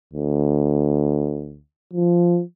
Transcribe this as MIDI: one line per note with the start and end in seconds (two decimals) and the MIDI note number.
0.14 1.60 38
1.93 2.42 53